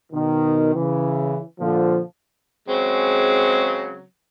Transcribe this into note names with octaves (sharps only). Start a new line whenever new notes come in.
B2 D#3
C#3 E3
A#2 D3 F3
C#3 F#3 G#3 C4